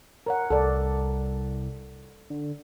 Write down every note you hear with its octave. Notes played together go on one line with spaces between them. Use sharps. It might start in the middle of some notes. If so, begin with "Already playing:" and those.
A#4 C#5 F#5
C2 A4 D5
D3